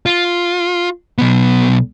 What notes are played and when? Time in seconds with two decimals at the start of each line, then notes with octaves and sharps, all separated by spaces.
0.06 F4
1.18 B1 B3